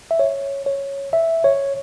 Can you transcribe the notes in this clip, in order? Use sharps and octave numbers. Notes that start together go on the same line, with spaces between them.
E5
C#5
C#5
E5
C#5